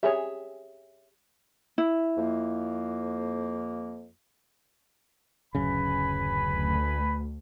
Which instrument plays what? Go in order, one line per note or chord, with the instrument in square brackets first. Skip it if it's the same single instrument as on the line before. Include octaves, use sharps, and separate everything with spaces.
[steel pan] G4 G#4 [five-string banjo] C#5 E5
[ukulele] E4
[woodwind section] F2 A#3
[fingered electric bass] D1 F#2 C#3 [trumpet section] B4 G#5 B5
[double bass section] D2